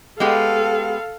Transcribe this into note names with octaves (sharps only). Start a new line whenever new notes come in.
G#3 B3 G4 A4 F5